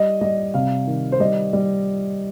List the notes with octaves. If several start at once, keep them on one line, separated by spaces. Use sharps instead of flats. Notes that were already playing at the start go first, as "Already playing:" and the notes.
Already playing: G3 D#5
G3 D#5
C3 F5
D#3
C5
G3 D#5
G3